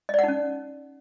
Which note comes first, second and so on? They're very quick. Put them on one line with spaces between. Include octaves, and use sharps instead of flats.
D#5 D5 F#5 D#4 C#4